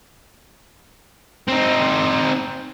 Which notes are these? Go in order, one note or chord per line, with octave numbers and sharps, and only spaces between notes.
C4 D#4